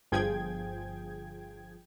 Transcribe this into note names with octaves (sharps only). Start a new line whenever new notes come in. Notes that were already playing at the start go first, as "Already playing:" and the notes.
G1 F3 G#4 G5 G#6